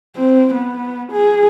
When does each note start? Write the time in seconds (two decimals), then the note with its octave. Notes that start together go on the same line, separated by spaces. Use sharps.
0.16 C4
0.54 B3
1.12 G#4